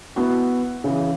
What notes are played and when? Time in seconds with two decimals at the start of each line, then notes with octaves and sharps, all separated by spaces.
0.16 B3 E4 F#4
0.84 C#3 E3